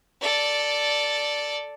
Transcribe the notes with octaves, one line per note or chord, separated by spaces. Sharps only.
A4 D5